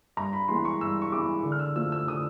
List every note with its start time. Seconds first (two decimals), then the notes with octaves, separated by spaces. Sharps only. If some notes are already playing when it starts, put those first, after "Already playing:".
0.17 G2 A#5
0.33 B5
0.48 E3 G#3 B3 C6
0.65 C#6
0.81 G2 E6
1.02 C#6
1.12 E3 G#3 B3 D6
1.44 D3
1.52 F6
1.59 E6
1.76 F3 A3 E6
1.92 E6
2.07 D3 D#6